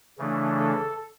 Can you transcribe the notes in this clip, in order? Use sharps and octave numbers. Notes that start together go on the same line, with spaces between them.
C#3 E3 A3 D4
A4